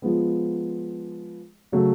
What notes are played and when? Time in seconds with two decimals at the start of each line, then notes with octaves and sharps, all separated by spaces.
0.02 F3 G#3 B3
1.72 C#3 F#3 A3